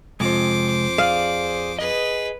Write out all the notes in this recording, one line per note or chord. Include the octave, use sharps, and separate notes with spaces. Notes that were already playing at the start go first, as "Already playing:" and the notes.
F2 C3 G#3 C5 D6
G#4 D5 F5
G#4 B4 D#5